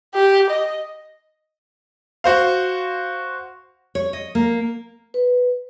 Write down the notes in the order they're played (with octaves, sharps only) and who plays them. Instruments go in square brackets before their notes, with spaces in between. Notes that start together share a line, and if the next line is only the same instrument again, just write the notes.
[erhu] G4
D#5
[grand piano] F#4 C5 F5
[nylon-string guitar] C#5
D#5
A#3
[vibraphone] B4